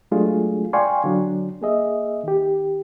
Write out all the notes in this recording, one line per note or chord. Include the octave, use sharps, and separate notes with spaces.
F#3 G#3 A3 D4 F4 G#4
D5 F5 G5 G#5 C6 C#6
D3 F#3 D4
A#3 G#4 D#5 E5
D#3 G4